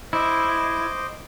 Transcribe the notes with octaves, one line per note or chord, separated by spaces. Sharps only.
E4 C5 D#5 D6